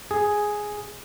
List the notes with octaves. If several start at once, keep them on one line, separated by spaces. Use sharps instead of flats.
G#4